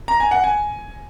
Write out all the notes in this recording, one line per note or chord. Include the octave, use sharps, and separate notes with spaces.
A#5
G#5
F#5
G#5